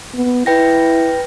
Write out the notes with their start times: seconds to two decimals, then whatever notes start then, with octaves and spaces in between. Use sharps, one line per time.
0.15 B3
0.46 E4 B4 G5 A#6